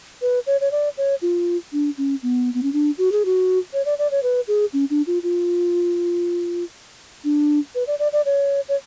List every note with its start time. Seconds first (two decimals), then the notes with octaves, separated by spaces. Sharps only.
0.22 B4
0.47 C#5
0.61 C#5
0.71 D5
0.97 C#5
1.22 F4
1.72 D4
1.98 C#4
2.23 B3
2.54 B3
2.63 C#4
2.73 D4
2.98 F#4
3.12 G#4
3.25 F#4
3.73 C#5
3.85 D5
3.99 D5
4.11 C#5
4.23 B4
4.48 G#4
4.73 C#4
4.90 D4
5.07 F4
5.23 F4
7.24 D4
7.75 B4
7.87 D5
7.99 D5
8.13 D5
8.25 C#5
8.69 C#5